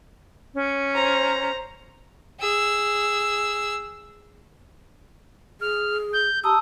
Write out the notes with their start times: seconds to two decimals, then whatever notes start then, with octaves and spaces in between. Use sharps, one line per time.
0.54 C#4
0.95 C5 A#5
2.40 G#4 E6
5.61 G#4 F6
6.13 G6
6.44 G4 A5 A#5 D#6 E6